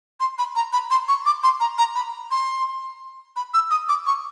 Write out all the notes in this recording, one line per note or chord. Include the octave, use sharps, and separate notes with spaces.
C6
B5
A#5
B5
C6
C#6
D6
C6
A#5
A#5
B5
C6
B5
E6
D#6
D6
C#6